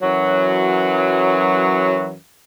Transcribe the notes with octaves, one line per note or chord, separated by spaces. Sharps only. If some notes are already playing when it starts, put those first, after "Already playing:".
F#2 E3 F#3